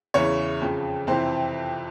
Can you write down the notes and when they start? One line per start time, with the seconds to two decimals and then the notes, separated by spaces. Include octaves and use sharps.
0.14 E2 C#3 E3 C#5
0.61 F2 C#3 F3
1.07 F2 C3 E3 C5